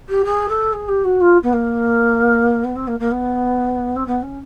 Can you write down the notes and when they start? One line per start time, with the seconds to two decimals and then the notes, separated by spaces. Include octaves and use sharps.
0.09 G4
0.25 G#4
0.48 A4
0.73 G#4
0.88 G4
1.04 F#4
1.20 F4
1.43 B3
1.52 A#3
2.64 B3
2.75 C4
2.87 A#3
2.99 A#3
3.11 B3
3.96 C4
4.07 B3
4.22 C#4